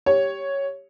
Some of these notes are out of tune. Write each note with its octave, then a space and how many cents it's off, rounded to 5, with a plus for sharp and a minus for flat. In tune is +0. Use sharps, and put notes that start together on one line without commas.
G4 +0 C#5 +0